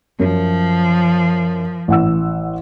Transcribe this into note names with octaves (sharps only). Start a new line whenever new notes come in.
F#2 F3
A1 F#5 E6